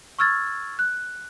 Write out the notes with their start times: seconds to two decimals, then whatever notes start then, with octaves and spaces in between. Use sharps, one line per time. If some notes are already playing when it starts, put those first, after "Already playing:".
0.19 C#6 E6 F6 G#6 A6
0.79 F#6